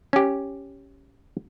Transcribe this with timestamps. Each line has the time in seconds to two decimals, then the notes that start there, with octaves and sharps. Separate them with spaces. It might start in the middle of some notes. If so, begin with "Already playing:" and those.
0.13 C#4 G4